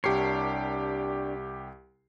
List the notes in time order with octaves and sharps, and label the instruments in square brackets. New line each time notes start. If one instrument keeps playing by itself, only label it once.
[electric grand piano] C2 G4 C7 [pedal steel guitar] D4 A#4 C#5